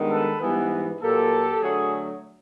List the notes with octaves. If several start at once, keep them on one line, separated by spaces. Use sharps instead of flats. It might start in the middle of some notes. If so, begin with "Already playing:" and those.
Already playing: G2 D#3 G#3 B3
A4 B4
G#2 E3 G3 B3
A#2 F#3 A#3 G4 A4
D3 F#3 A3 F#4 G#4